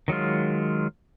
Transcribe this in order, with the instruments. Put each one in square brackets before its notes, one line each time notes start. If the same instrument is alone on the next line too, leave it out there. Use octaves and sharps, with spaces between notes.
[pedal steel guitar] D#3 F#3 G#3 F4